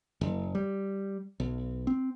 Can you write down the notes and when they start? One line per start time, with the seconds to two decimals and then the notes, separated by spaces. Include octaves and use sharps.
0.21 F#1
0.55 G3
1.40 B1
1.87 C4